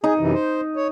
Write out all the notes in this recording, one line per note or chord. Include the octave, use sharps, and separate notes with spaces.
D#4 G#4
F#2 C3 E3
C5
C#5